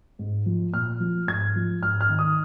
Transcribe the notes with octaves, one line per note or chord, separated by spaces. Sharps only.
G#2
F3
A#2 F6
F3
G#2 G#6
F3
G#2 F6
F6
D#3
D#6